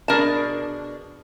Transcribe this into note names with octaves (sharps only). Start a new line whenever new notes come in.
B2 D4 G#4 A#4 A5